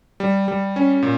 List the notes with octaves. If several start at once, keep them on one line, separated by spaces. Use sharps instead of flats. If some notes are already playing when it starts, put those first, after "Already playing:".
G3
G3
C#4
A#2